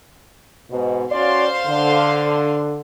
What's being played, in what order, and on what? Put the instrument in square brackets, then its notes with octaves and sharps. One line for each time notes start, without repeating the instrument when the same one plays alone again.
[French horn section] G#2 B2
[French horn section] C#4 F#4 D5 [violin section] C5 F5 C6
[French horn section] D3